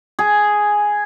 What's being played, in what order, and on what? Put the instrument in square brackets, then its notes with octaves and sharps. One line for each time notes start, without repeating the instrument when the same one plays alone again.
[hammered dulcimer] G#4